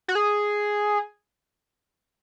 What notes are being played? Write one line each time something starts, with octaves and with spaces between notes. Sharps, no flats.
F#4
G#4